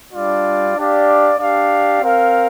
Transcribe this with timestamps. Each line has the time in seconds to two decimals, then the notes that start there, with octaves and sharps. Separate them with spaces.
0.13 G3 D4 F4 D5
0.76 D4 G4 D5 F5
1.39 D4 G4 D5 F5
2.02 C4 A#4 F5